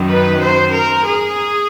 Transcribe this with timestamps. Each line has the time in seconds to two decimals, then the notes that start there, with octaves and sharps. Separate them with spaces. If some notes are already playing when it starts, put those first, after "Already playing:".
Already playing: F#2 D#3
0.09 B4
0.42 C5
0.74 A#4
1.07 G#4